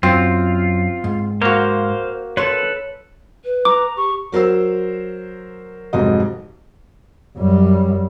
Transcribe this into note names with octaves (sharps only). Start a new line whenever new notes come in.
F#2 C4 F4
G#2
A#3 F#4 C5 F5
A4 B4 C#5 C6
B4
A#5 D6
G4 C#6
F#3 A#4 C5 E6
F1 G#2 F#3 D#5
F#2 G3